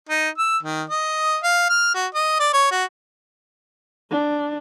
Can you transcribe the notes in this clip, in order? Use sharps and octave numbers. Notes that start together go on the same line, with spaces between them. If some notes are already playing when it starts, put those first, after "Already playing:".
D#4
E6
D#3
D#5
F5
F6
F#4
D#5
D5
C#5
F#4
D4